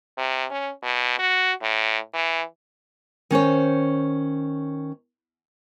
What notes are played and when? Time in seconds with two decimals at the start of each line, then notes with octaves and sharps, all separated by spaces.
0.18 C3
0.51 C#4
0.83 B2
1.19 F#4
1.62 A2
2.14 E3
3.31 D#3 C#4 C5 C#5